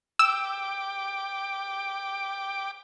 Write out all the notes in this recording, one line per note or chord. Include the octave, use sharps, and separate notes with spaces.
G5 D6 E6